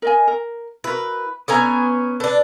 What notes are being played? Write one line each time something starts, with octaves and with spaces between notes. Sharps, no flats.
A#4 D#5 G#5
A#4
E4 F#4 A#4 B4
B3 C#4 A4 G#5 A#5
D4 A4 B4